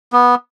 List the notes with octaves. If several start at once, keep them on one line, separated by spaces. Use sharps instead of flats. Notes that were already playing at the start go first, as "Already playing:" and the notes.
B3